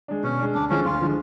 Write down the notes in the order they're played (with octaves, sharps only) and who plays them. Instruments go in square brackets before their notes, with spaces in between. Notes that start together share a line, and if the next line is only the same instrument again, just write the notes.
[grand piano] G#3 D4
[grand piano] B2 [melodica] C#4
[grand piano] G#3 D4
[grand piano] D2 [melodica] D4
[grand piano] D3 F3 G#3 [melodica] C#4
[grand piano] D2 [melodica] F4
[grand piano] D3 F3 G#3